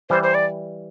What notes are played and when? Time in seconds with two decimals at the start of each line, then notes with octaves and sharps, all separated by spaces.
0.10 E3 G3 C5
0.23 C5
0.34 D5